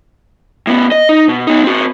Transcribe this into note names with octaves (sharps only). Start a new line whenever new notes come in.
A2 B3
D#5
D#4
B2
B3 D#4
C4 F#4